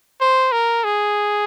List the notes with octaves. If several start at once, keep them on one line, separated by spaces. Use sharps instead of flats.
C5
A#4
G#4